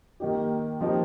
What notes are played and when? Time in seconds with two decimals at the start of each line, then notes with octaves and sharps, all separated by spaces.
0.20 D#3 A#3 D#4 G4
0.81 F3 A#3 D#4 G4